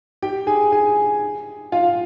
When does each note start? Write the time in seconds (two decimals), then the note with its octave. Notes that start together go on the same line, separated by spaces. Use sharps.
0.22 G4 G5
0.47 G#4 G#5
0.72 G#4 G#5
1.72 F4 F5